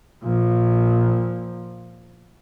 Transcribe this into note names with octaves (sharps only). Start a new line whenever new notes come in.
A#2 F3